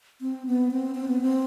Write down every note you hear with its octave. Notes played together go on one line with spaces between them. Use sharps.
C4
B3
C4
C4
B3
C4